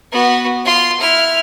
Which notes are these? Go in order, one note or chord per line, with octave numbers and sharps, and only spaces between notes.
B3 F#4
F4 C6
E4 F6